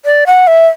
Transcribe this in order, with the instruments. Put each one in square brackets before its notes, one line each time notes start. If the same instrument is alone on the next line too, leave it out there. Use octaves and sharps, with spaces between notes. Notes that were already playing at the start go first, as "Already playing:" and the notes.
[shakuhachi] D5
F#5
E5